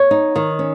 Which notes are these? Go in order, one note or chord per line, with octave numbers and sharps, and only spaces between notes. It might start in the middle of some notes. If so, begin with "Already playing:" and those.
Already playing: C#5
D#4
D#3
C#4